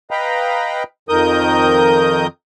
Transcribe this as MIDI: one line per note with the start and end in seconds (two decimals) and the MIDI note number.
0.11 0.83 71
0.11 0.83 75
0.11 0.83 77
0.11 0.83 79
0.11 0.83 82
0.11 0.83 83
1.09 2.27 41
1.09 2.27 51
1.09 2.27 70
1.09 2.27 87
1.09 2.27 91